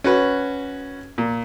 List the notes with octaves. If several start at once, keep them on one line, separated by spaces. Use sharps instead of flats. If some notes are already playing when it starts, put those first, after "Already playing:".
C#4 F#4 B4
A#2